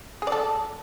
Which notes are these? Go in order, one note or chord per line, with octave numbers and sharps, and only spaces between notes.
G#4
D5
A4